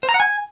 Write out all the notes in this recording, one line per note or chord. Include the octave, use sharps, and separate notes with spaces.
C5
A#5
F#5
G#5